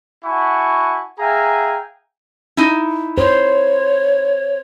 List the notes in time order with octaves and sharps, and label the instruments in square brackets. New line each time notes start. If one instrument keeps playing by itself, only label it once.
[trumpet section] E4 F#4 F#5 G#5 A5 C#6
G#4 E5 F5 G5 G#5 A#5
[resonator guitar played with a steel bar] D#4 E4
[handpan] C5 [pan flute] C#5